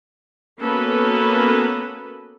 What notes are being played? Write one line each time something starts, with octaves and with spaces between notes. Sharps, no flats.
A#3 B3 C#4 F#4 A4 B4